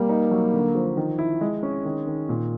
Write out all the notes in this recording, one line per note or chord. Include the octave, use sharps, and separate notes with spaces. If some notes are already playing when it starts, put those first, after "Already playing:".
Already playing: G3 A#3
D#4
F#3
D3
F3
D#3
E4
G#3
C#4
D#3
D#3
A#2